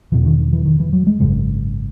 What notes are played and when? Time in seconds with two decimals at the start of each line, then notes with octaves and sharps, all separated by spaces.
0.12 E1 E2 B2 E3
0.25 D#3
0.39 D#3
0.53 E3
0.65 D#3
0.80 E3
0.93 F#3
1.07 G#3
1.20 G#1 F#2 C#3 G#3